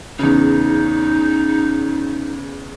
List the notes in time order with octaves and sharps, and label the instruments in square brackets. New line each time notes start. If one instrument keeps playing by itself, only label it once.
[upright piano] E2 C#3 [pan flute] D#4